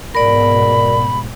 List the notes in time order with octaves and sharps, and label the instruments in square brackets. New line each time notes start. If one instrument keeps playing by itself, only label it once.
[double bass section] G#2 B2 [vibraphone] A#4 D5 [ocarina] B5